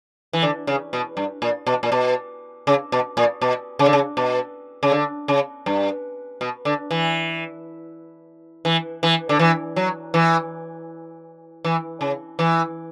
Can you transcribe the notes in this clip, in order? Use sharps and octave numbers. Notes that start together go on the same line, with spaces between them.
E3
D3
C#3
B2
G2
A#2
B2
A#2
B2
C#3
B2
A#2
B2
C#3
D3
C#3
B2
C#3
D3
C#3
G2
B2
D3
E3
E3
E3
D3
E3
F#3
E3
E3
C#3
E3